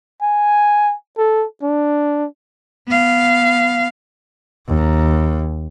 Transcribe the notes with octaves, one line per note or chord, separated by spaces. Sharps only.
G#5
A4
D4
B3 F5
D#2